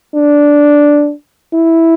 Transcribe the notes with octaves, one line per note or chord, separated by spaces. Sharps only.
D4
E4